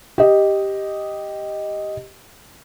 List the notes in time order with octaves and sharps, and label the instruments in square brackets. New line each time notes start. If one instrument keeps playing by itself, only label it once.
[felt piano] G4 D#5